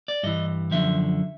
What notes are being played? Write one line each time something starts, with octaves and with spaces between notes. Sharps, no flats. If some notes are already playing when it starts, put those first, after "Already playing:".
D5
G2 E3 D#5
F#2 D3 F3 E5